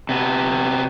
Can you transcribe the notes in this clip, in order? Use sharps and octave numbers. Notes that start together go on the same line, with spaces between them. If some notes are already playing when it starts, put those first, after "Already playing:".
C3 B3